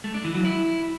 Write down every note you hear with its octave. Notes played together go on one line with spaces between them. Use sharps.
A3
D4
E3
F#3
E4